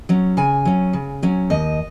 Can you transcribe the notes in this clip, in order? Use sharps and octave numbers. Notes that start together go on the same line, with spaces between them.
F#3 C#4
C#3 G#5
F#3 C#4
C#3
F#3 C#4
D#2 D#5